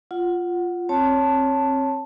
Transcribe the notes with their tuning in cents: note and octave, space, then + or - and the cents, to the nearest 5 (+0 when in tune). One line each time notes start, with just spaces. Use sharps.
F4 +0 F#5 +0
C4 +30 C#5 +0 A5 +0